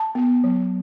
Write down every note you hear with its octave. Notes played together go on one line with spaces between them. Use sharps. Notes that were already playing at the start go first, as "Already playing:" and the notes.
Already playing: A5
B3
F#3